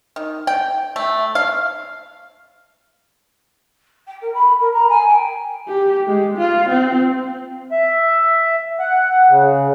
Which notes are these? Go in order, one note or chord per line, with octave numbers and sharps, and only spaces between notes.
D#3
G5
A3
F5
G5
A#4
B5
A#4
A#5
G#5
G5
G4
G#3
F4
C4
E5
F#5
C#3